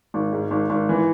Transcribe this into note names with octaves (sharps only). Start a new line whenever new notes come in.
G#1
G#2
G#1
G#1
E3